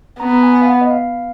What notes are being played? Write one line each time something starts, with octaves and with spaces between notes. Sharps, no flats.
B3 A#5
A#5
G#5
F5
F#5
D#5
F5